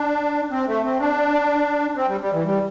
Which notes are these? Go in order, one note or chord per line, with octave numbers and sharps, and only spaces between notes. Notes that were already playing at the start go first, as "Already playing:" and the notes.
Already playing: D4
C4
A3
C4
D4
C4
G3
G3
E3
G3